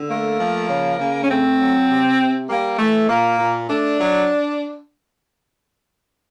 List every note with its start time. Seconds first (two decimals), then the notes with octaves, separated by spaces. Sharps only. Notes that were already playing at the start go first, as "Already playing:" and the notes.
Already playing: D3
0.10 A3 A#3
0.40 F3
0.69 C#3
1.00 C#3
1.22 C#4
1.29 A3 C4
1.59 F#3
1.89 C3
2.19 C3
2.50 G3 A#3
2.79 E3 A3
3.10 A#2 A#3
3.39 A#2
3.70 A3 D4
3.99 F#3